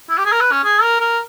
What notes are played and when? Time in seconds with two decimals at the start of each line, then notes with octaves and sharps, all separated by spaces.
0.10 E4
0.18 G4
0.25 G#4
0.32 A#4
0.41 B4
0.51 C#4
0.64 G#4
0.83 A#4
1.00 A#4